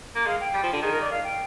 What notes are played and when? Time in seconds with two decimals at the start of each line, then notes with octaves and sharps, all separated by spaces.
0.15 A#3
0.25 G#3 F5
0.40 G5
0.54 G3
0.63 F3
0.73 D3
0.82 D#3 G#4
0.91 A#4
1.01 D5
1.10 F5
1.24 G5